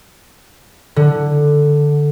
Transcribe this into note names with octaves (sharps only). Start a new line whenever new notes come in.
D3